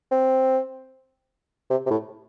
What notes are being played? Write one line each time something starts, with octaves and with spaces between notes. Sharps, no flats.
C4
C3
C3
A2